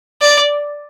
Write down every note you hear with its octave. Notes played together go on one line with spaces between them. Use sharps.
D5